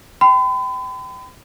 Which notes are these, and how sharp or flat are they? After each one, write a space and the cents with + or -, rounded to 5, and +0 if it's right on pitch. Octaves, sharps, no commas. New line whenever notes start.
G5 -20 B5 +45